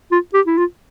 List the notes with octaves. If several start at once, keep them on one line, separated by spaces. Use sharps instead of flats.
F4
G4
E4
F4